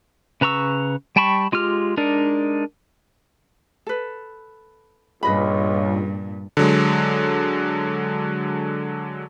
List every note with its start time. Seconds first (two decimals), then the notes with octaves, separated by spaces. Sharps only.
0.41 C#3 B4 A#5 C#6 E6
1.16 G3 G5 A5 B5 C#6
1.52 G#3 F4 G4 F6
1.97 G#3 D4 D#4 A#4 D5
3.87 A4 B4
5.23 C#2 G2 A#2 B4 D#5 B5
6.57 D3 F#3 G#3